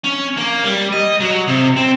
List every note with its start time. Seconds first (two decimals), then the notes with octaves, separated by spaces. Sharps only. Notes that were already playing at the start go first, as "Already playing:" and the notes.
0.04 C#4
0.37 A#3
0.64 G3
0.93 D#5
1.20 F#3
1.48 C3
1.76 C4